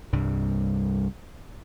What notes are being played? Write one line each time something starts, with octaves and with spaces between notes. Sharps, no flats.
C2 G2 G3